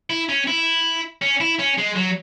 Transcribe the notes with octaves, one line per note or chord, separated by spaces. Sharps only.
E4
C#4
E4
C#4
E4
C#4
G#3
F#3